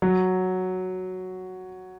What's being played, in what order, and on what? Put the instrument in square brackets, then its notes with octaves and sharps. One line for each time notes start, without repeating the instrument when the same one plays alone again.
[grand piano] F#3